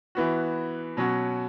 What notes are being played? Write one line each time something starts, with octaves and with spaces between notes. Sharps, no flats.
E3 B3 F#4
B2 F#3 C#4 F#4